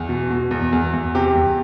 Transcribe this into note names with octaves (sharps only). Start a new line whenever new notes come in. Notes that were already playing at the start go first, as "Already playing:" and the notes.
Already playing: E2
B2
B2
E2
E2
E2
C3 G4
E2